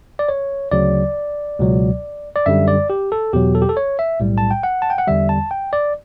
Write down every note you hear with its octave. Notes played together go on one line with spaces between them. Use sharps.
D5
C#5
D2 C#3 F#3 D5
C#2 B2 F#3
D5
F#2 D3 G3 E5
D5
G4
A4
E2 B2 F#3 G4
A4
G4
A4
C#5
E5
B1 A2 G3
A5
G5
F#5
A5
G5
F#5
E2 D3 G3 E5
A5
G5
D5